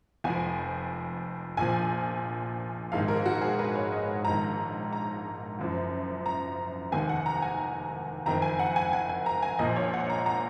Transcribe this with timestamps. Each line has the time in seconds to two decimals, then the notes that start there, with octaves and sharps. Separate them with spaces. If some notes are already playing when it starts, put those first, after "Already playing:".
0.24 F1 F2 F3 G#5
1.57 A#1 A#2 F3 G#5
2.92 A#1 G#2 D#3 F5
3.08 A#4
3.26 F#4
3.41 G#4
3.59 B4
3.75 C#5
3.92 D#5
4.25 A#1 G#2 D#3 A#5
4.93 A#5
5.59 F#1 F#2 F3
6.26 A#5
6.92 F1 D#2 D#3 G#5
7.09 F#5
7.26 A#5
7.42 G#5
8.26 F#1 F2 D#3 A#5
8.42 G#5
8.59 F#5
8.76 G#5
8.93 G#5
9.09 G#5
9.26 A#5
9.43 G#5
9.59 A#1 A#2 F3 D#5
9.76 C#5
9.94 F#5
10.10 A#5
10.26 A#5